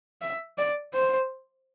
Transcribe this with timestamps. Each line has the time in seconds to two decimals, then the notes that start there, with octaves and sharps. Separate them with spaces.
0.22 E5
0.58 D5
0.94 C5